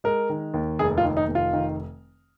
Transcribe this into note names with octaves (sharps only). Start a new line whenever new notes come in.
G#3 A#4
D#3
D#2
F1 G#4
F4
D#3
D#4
F1
F4
D#3